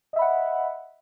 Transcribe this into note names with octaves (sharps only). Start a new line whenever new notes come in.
D#5 E5 F#5 B5